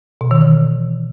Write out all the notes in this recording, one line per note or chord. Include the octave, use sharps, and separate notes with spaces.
B2
D#3
E3